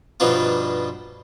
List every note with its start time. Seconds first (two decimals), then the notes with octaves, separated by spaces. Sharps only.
0.20 G2 B2 F3 D4 D#4 F4